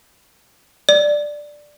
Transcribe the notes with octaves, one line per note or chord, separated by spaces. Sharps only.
D5